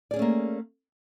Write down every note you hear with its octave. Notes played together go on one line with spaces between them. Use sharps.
A3 A#3 C#4 G#4 D5